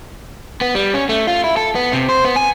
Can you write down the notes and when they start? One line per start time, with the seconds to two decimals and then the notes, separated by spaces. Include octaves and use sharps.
0.61 B3
0.75 G3
0.94 C#4
1.09 A3
1.27 F4
1.44 E4
1.57 A4
1.75 B3
1.93 C3
2.09 C5
2.25 B3
2.36 G#5